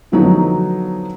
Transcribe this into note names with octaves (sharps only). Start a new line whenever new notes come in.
D3 F3 F#3 B3 D#4